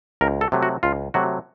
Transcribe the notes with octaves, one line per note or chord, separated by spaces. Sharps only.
C#2 A#4
A4
C3 F#3 A3
F#4
C#2 F4
C3 F#3 A3 F#4